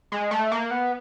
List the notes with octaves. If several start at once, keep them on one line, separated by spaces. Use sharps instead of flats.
G#3
A3
A#3
B3